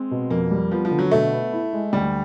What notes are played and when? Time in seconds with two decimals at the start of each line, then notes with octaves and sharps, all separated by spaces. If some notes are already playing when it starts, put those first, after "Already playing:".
Already playing: G#3 C4
0.11 B2
0.30 F2 A#3
0.51 G3
0.71 F3 B3
0.85 F3
0.91 D3
0.99 F#3
1.11 B2 A3
1.33 B3
1.53 E4
1.73 G#3
1.93 D2 G3